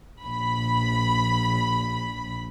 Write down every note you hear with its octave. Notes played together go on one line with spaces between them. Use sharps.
A#1 B5